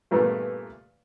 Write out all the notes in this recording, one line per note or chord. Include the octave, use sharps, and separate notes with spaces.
G2 A#2 E3 A3 B3